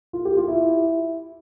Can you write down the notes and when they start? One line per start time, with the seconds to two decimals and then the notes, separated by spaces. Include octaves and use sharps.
0.13 F4
0.25 G4
0.37 F4
0.48 E4